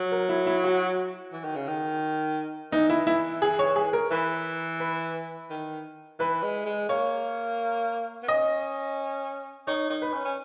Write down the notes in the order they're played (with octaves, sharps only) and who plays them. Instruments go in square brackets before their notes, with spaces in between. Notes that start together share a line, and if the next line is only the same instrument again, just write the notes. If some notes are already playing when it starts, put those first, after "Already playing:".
Already playing: [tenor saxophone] F#3
[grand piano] A#4
E4
E4
F#4
[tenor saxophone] E3
D#3
C#3
D#3
[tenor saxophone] E3 [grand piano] D#4
[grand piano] E4
E4
G#4
C#5
G#4
A#4
[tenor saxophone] E3 [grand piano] B4
[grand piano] B4
[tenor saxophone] D#3
[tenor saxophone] E3 [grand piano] B4
[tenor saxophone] G#3
G#3
[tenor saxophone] A#3 [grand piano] C#5
[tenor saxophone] B3
[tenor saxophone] C#4 [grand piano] D#5
[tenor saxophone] D#4 [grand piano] C#5
[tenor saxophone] D#4
[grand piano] B4
[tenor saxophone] C#4
C#4